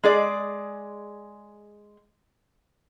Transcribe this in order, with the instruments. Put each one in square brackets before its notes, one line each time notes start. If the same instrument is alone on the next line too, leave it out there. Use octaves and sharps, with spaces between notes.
[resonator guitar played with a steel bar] G#3 G#4 D5